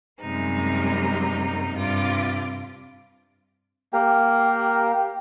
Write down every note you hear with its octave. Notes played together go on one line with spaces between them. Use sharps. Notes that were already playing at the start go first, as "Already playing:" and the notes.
F#2 C3 G3 G#3 A#3 D#4
G2 C3 F4 D6
A#3 G4 A#4